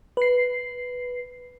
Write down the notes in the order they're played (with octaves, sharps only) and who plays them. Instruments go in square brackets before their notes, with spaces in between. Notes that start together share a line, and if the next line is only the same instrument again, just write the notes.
[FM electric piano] B4 C7